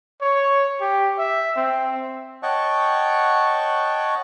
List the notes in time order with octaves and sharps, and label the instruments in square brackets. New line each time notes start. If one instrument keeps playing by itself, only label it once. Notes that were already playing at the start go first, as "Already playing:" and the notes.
[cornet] C#5
G4
E5
C4
[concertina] C#5 D#5 F#5 G5 A5 C#6